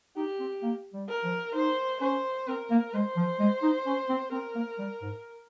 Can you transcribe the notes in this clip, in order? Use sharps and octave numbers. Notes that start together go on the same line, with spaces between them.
D#4 G4
C4
A#3
G3
A#4
F3
D#4 C5
C#4 C5
C4 A#4
A#3
G#3 C5
F3
G#3
D#4
C#4
C4
C4 A#4
A#3
G3
G#2